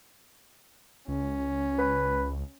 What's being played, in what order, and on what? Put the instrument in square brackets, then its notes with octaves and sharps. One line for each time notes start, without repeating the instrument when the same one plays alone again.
[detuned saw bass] C#2 [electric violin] C#4
[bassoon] B4